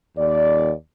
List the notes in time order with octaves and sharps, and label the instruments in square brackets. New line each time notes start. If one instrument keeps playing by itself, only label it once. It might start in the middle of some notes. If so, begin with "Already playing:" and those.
[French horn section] D#2 D5